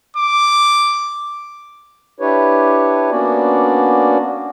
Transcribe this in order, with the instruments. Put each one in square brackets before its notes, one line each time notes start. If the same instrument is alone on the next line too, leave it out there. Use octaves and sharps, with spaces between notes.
[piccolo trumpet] D6
[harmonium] D4 E4 G4 B4 C#5
A#3 B3 C#4 D4 F#4 D5